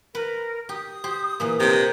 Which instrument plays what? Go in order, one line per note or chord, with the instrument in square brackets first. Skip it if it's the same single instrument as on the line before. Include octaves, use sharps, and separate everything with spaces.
[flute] A#4 [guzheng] B4
[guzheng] G4 [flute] D#6
[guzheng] G4 C5
A#2 E3 A#3
[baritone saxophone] C3 [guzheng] A#3 D#4